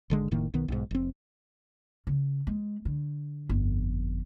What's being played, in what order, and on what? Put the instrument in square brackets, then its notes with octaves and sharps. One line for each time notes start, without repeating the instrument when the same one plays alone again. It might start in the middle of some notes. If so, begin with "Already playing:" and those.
[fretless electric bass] G#1 D3 G#3
F1 A2 D#3 A#3
B1 D#3 B3
B1 G#2
F1 C4
[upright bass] C#3
G#3
D3
G1 F2